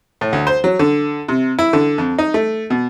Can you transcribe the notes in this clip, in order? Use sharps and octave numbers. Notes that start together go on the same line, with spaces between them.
A2
D2
C5
F#3
D3
C3
E4
D3
F2
D#4
A3
B2